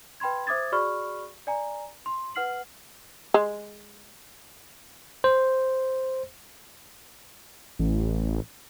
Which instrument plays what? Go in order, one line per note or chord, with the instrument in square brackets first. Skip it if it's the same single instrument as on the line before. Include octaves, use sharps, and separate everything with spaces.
[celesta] B4 G5 B5 C6 G#6
C5 E5 D6 D#6 G#6 A6
F#4 G#4 D5 B5 C#6 F6
D5 G#5 A#5
C6
B4 F#5 F6 C7 F#7
[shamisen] G#3
[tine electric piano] C5
[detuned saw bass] A1